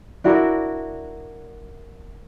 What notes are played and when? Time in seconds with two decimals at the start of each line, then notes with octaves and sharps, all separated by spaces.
0.24 D4 E4 F#4 A#4